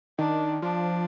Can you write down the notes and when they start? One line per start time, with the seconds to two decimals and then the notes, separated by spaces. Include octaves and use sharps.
0.18 D#3 D4
0.62 F3 D4